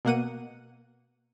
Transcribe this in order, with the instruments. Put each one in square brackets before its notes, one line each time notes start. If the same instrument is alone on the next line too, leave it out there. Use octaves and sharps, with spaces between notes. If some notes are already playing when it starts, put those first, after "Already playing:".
[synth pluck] B2 A#3 F#5 D#7